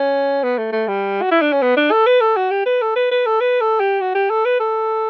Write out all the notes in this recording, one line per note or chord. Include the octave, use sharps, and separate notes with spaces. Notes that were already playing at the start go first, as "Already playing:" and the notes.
Already playing: C#4
B3
A3
A3
G3
F#4
E4
D4
C#4
B3
D4
A4
B4
A4
F#4
G4
B4
A4
B4
B4
A4
B4
A4
G4
F#4
G4
A4
B4
A4